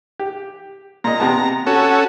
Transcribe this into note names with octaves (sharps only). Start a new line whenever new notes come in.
G4
A#2 D#5 A#5
C3 B3 A5
C#4 F#4 A4